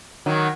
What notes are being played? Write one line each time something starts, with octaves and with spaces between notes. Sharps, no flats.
D#3 F#3